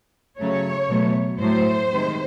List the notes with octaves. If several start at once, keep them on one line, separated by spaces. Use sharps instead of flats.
C#3 F#3 A3 C#5
B2 F#3 A3
A2 F#3 A3 C5
C3 D#3 G#3